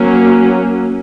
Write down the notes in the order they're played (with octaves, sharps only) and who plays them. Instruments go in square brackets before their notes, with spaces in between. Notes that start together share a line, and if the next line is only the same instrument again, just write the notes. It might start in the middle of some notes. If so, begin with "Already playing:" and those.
Already playing: [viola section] F#3 A#3 C#4